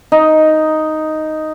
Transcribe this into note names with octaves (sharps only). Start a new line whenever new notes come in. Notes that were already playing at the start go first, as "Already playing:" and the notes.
D#4